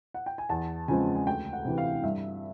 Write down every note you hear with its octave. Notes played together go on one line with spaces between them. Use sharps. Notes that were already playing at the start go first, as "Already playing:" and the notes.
F#5
G5
G#5
E2 A5
C#3 F3 G#3 C4 G#5
G#5
D2 G5
F#5
C3 E3
F5
G2 E5